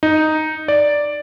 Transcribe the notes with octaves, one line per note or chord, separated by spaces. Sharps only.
D#4
D5